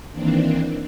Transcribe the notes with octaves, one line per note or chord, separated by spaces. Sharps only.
D#3 E3 A#3 C4 D4